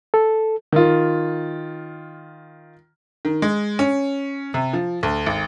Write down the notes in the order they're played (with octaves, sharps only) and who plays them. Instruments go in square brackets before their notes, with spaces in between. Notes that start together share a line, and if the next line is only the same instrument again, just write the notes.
[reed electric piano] A4
[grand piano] D#3 F4
[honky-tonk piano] D#3
G#3
C#4
C3
F3
D2
G#1